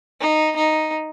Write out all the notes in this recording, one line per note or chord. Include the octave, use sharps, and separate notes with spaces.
D#4
D#4